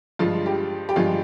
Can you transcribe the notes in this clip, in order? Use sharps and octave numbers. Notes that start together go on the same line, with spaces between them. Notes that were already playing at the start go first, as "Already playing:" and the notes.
G2 F3 G#3 F4
G4
G4
G2 F3 G#3 F4 G#4